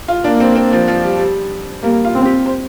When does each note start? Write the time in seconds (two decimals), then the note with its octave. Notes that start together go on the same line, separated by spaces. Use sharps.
0.08 F4
0.24 A#3 D4
0.40 C4
0.56 C4
0.72 F3
0.88 F3
1.04 G3
1.19 G3
1.83 G3 A#3
2.05 F4
2.15 C4
2.26 G4
2.46 C5